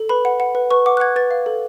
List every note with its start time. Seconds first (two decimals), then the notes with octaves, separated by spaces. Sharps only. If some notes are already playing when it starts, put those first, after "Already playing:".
Already playing: A4
0.09 B4 B5
0.25 F#5
0.40 F#5
0.55 B4
0.71 B4 C#6
0.86 F#5 D6
0.97 F#6
1.00 F#5 G#6
1.16 B4 A6
1.31 F5
1.46 A4